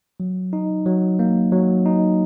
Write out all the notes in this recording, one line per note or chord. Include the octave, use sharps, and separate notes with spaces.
F#3
D#4
F#3
A#3
F#3
D#4